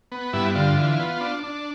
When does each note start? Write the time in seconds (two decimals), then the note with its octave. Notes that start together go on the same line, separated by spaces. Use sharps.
0.12 B3
0.33 G2 E4
0.55 D3 F4
0.77 E3
0.99 B3
1.21 D4
1.43 D4